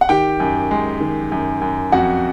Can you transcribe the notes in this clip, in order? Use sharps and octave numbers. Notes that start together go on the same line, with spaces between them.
F#5
D#3 G4 G5
F#2
G#3
D#3
F#2
F#2
F2 F#4 F#5